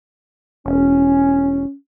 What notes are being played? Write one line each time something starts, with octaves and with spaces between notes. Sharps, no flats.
E1 C#4